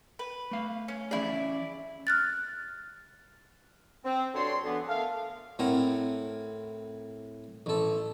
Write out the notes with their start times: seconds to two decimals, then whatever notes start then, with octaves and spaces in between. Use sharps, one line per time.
0.19 B4
0.51 A3 F5
0.88 C#4
1.11 E3 C#4 E4 G#4 D5
2.07 F6 F#6 A6
4.05 C4
4.34 G2 D3 F#4 C#5 D5 C6
4.64 D3 E3 B3
4.88 A3 A4 A#4 F5
5.59 A2 C4 A#4 F#5
7.66 A1 A4